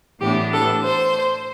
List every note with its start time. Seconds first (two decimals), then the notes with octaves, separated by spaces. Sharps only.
0.20 A2 E3 B3 D4 G4
0.53 A4
0.83 C5